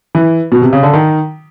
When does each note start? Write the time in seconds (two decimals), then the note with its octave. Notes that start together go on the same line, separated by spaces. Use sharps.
0.15 E3
0.52 B2
0.62 C3
0.73 C#3
0.83 D3
0.93 D#3